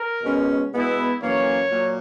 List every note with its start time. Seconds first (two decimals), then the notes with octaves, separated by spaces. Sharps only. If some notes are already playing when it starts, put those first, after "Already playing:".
Already playing: A#4
0.23 B2 G#3 C#4
0.72 B2 G#3 B3 E4
1.21 F#2 E3 A#3 C#5
1.70 A#2 F#3